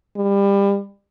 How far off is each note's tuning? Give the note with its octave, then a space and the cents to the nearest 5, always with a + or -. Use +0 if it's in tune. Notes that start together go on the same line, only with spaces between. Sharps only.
G3 +25